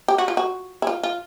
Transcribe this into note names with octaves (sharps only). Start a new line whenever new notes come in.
G4
F#4
F4
F#4
E4
F4
F4